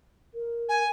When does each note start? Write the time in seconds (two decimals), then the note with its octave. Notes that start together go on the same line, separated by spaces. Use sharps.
0.34 A#4
0.69 G#5